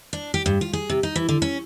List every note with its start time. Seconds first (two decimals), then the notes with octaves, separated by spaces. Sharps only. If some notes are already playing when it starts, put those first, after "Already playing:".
0.13 D4
0.34 G4
0.46 G2
0.61 F4
0.73 G#4
0.90 C3
1.03 D#4
1.15 E3
1.29 D3
1.42 C#4